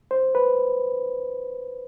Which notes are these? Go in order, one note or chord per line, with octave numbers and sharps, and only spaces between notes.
C5
B4